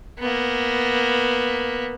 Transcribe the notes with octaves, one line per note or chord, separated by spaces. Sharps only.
A#3 B3